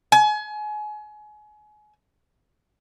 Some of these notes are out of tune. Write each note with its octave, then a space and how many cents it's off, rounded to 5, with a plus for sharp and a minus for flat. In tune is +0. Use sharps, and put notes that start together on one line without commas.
G#5 +30